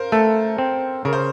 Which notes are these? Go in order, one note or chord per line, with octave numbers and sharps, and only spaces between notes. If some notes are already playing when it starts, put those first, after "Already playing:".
Already playing: A#4 C5 F5
A3 A4
C4
C#3 A#4
C5